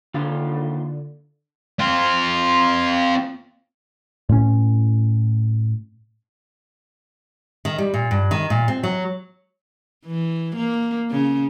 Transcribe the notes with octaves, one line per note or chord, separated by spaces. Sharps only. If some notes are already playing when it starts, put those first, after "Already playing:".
D#2 D3 F4
C4 F4
A2 C#4
D#3
G3
A#2
G2
D#3
A#2
C4
F#3
E3
A#3
C#3